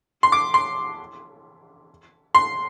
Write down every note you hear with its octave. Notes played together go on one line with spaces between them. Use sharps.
C6
D6
C6
C6